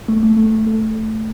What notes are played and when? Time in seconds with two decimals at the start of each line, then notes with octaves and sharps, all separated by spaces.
0.08 A3
0.23 A3
0.37 A3
0.66 A3